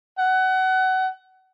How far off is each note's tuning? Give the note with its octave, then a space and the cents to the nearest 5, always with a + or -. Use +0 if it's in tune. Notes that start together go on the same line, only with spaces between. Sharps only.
F#5 +25